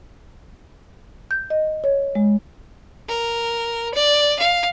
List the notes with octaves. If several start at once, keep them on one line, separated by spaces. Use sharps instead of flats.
G6
D#5
C#5
G#3
A#4
D5
F5